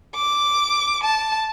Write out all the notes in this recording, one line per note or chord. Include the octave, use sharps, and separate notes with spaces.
D6
A5